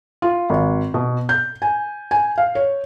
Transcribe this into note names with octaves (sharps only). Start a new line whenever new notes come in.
F4
G#1
B2
G6
G#5
G#5
F5
C#5